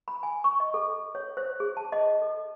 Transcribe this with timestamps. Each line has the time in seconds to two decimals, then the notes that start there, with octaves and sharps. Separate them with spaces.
0.08 B5
0.23 G#5
0.44 C#6
0.60 D#5
0.74 A4
1.15 C#5
1.37 C5
1.60 G#4
1.77 A5
1.92 D#5
2.22 A4